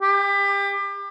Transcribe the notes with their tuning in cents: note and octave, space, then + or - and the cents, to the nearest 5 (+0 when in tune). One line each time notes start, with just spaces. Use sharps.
G4 +30